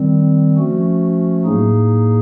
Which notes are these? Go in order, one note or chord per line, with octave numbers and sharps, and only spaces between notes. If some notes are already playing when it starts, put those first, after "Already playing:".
Already playing: D#3 G3 C4
F3 A3 C#4 F#4
A2 F#3 A#3 D#4 G#4